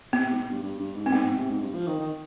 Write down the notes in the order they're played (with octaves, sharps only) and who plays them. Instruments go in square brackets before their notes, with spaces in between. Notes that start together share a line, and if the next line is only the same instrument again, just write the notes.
[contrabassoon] C3 [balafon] B3
[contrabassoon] C3
G#2
B2
G2
G2
G2
G#2
[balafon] C4
[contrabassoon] G#2 [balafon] B3
[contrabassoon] G#2
C3
G#2
G2
F3
D#3
D#3